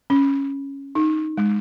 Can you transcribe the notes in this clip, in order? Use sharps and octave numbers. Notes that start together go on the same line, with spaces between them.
C#4
D#4
G#3